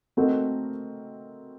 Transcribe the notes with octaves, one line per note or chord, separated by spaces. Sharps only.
A3 C4 D#4 F#4 A#4